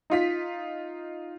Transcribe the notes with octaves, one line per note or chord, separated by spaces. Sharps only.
D#4 F4 B6